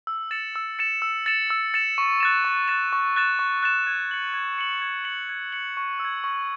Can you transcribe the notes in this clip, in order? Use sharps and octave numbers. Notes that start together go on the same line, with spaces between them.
E6
A6 C#7 E7
E6
A6 C#7 E7
E6
A6 C#7 E7
E6
A6 C#7 E7
C#6
F#6 A6 E7
C#6
F#6 A6 E7
C#6
F#6 A6 E7
C#6
F#6 A6 E7
G#6
C#7 F#7
G#6
C#7 F#7
G#6
C#7 F#7
G#6
C#7 F#7
C#6
E6
G#6
C#6